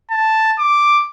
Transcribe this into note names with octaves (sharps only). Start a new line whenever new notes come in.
A5
D6